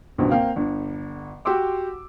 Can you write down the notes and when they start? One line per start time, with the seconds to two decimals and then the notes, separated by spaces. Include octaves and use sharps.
0.18 G#1 C#2 G2 B2 D3 F3
0.30 A#3 C4 F5 G5
0.56 G1 D3
1.45 F#4 G4 C6 D6 E6